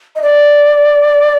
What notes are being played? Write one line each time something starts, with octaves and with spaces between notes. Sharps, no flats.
D#5
D5